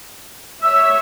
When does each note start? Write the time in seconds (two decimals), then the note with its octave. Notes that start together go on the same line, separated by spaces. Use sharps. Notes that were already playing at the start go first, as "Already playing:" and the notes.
0.62 C#5 E5 E6